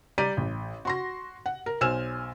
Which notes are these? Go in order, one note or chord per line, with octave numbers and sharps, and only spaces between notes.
G3 D5 A#5 G6 B6 D#7
A1
F#4 C6 A#6
F#5
A#4
B1 C5 G#5 E6 F6 E7